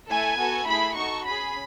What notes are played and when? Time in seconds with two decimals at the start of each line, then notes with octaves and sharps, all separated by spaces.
0.09 A3 E4 A4 G#5
0.38 B3 F#4 A4
0.67 A3 E4 G#4 B5
0.96 D#4 F#4 A4 C#6
1.25 C#4 G#4 B5